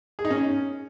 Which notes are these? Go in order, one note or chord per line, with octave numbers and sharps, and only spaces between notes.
G#4
D#4
C#4